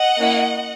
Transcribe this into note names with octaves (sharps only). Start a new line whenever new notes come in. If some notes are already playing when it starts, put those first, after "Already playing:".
Already playing: D#5 F#5
A#3 C#4 E4